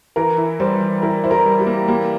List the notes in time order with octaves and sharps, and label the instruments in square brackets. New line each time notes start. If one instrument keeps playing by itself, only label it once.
[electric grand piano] E3 [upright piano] A#4
[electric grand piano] E4
[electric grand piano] G3 [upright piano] C5
[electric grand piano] E3
[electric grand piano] E4 [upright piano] A#4
[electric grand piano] E4 [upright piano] C5
[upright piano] A#4
[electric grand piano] G3
[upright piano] G4
[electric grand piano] A#3
[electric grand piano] A#3 [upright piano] G4